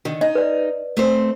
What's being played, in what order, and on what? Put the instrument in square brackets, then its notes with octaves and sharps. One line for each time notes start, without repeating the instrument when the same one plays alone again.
[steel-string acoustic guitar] D3 D#3
[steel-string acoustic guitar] D#4 [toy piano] D#5
[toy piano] B4 D5
[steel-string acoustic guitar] A3 C4 C5